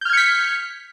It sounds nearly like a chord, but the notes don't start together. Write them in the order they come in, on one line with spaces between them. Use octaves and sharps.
G6 F6 G#6 C#7 B6